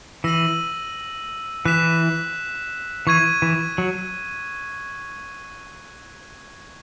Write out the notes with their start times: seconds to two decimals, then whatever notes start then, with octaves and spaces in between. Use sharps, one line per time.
0.24 E3 E6 A#6 D#7 F#7
1.65 E3 F#6 B6 E7
3.07 E3 C#6 G#6 D#7
3.42 E3
3.78 F#3